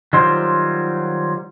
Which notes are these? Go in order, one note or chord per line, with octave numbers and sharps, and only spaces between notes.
D#3 F#3 G3 F4 C5